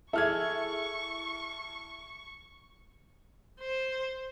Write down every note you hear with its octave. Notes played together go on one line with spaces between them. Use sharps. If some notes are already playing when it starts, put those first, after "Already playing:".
E4 G#4 A4 E5 C#6 F6 G#6
C5